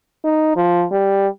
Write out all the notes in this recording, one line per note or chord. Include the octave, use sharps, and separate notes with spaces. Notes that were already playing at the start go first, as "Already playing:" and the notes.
D#4
F3
G3